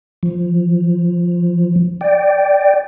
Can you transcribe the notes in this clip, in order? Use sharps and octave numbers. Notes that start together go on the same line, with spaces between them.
F3
D5 G5